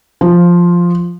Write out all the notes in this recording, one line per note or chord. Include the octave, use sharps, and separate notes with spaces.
F3